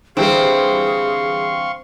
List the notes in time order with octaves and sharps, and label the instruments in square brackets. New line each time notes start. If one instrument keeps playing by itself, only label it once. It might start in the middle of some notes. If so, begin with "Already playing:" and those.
[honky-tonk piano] D3 E3 G3 [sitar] C4 [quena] G#4 [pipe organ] F5 C6 C#6